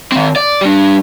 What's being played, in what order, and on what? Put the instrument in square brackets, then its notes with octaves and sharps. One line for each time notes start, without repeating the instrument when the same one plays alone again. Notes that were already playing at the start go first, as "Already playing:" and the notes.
[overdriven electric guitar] D#3 C4
D5
G3 D4